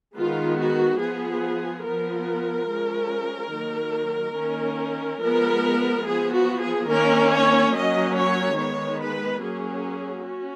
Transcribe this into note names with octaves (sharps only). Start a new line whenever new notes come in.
D#3 G#3 B3 F4
F#4
F3 B3 G#4
F3 B3 A#4
F3 G#3 C#4
D#3 F#3 A#3
D#3 A#3 C#4
F3 G#3 B3 A#4
F3 B3 G#4
F#4
G#4
D#3 A#3 C#4 A#4
C#5
F#3 A#3 C#4 D#5
C#5
D#3 G#3 B3 C#5
B4
F#3 A#3 C#4 G#4
C#4 F#4